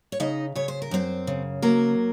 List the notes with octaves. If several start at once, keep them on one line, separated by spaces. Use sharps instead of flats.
C#5
C#3 D#4 D#5
C#3 C#5
C5
A#4
F#2 C4 C5
C#3
F#3 A#3 A#4